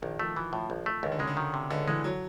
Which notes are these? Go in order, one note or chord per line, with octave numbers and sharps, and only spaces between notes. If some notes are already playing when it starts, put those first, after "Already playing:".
A#1 D#3
F3 A3
E3 F3
A2 F3
A#1
A3
C#2 D#3
D3
C#3 G#3
D3
D#3
C3
C#2 D3
E3 G#3
F#3